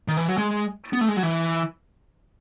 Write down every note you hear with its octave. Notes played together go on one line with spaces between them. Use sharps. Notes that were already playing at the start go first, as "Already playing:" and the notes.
D#3
E3
F#3
G#3
B3
A3
G#3
F#3
E3